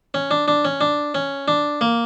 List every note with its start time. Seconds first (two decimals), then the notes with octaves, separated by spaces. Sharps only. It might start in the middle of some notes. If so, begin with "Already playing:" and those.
0.14 C#4
0.31 D4
0.48 D4
0.65 C#4
0.81 D4
1.15 C#4
1.48 D4
1.81 A#3